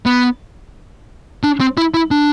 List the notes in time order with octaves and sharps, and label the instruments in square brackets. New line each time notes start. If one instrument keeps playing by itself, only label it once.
[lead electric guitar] B3
D4
C4
E4
E4
D4